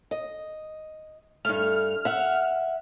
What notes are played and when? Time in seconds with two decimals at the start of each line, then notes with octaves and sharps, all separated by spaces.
0.11 D#5
1.45 G2 A3 F6
2.05 E5 F#5